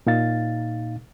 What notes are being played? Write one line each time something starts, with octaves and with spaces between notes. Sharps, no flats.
A#2 D#4 F5 A6